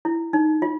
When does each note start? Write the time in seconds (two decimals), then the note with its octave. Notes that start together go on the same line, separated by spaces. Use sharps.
0.05 E4
0.33 D#4
0.62 F4